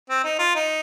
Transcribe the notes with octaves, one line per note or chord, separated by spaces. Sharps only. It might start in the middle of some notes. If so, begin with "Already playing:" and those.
C4
D#4
F4
D#4